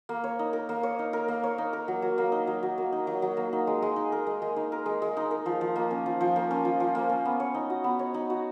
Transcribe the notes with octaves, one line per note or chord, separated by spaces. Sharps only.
A#3
C#5
D#4
A#4
A#3
C#5
D#4
A#4
A#3
C#5
D#4
A#4
F#3
F#3
A#3
D#4
F#3
F#3
A#3
D#4
F#3
F#3
A#3
D#4
G#3
G#3
D#4
A#4
G#3
G#3
D#4
A#4
G#3
G#3
D#4
A#4
F3
F3
A#3
C#4
F3
F3
A#3
C#4
F3
F3
A#3
C#4
B3
C#5
D#4
F#4
B3
C#5
D#4
F#4